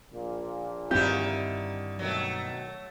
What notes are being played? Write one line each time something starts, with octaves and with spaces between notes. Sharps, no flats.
A#1 A#2
G2 D3 D#3 C4 E4 G4
B2 D#3 F#3 A3